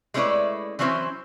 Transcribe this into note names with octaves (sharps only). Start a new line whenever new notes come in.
G#3 A3 C#4 E4 B4 D5
E3 F#3 C4 C#4 E4 C5